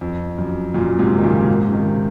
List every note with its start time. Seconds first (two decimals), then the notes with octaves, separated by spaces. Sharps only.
0.01 F2
0.38 F#2
0.74 F#2 A#2
0.99 G#2 C3
1.18 D#3
1.23 A#2 C#3
1.48 G#2 C3
1.69 C#3
1.72 C3 D#3